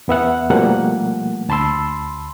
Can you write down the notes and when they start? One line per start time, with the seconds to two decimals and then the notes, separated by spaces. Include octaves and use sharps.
0.08 E2 B3 E5 F#5
0.50 B2 F3 G3 A3 A#3 F#5
1.49 D2 A5 B5 C6 E6